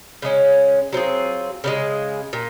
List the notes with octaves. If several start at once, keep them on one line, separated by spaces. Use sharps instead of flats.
C#3 G#3 C#4
F#3 C4 F4 G#4
C#3 F3 G#3
A#2